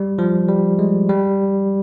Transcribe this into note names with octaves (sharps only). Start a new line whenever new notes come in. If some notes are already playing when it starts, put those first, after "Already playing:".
Already playing: G3
F3
G3
G#3
G3